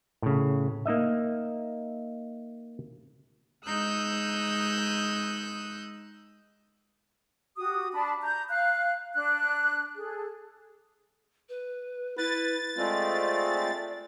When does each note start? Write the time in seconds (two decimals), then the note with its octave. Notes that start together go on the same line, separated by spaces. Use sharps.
0.22 A2 C#3
0.86 A#3 D#4 D#5 E5
3.66 G#3 D#4 D#6 E6 F#6 G6
7.57 F#4 G4 D#6
7.93 D4 A5 B5
8.22 A#5 G6
8.49 F5 F#6
9.15 D4 F#6
9.96 G#4 A4
11.49 B4
12.18 E4 B4 A6
12.78 G#3 A3 C4 F4 D5